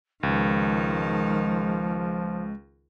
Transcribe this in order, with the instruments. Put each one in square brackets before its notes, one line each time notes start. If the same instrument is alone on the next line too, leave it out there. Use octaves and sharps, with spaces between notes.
[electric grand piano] C#2 [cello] D#3 [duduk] F3 [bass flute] G#3